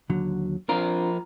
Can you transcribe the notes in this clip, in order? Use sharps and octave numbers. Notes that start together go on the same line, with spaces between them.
D#2 D3 F#3
F3 C4 D4 F4 A#4